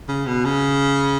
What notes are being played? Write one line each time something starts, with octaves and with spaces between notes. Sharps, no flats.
C#3
B2
C#3